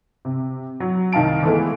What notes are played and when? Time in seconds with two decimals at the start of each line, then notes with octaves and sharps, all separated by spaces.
0.25 C3
0.80 F#3
1.13 C2 D#3 F5 A5 D7
1.43 E3 G#3 A3 B3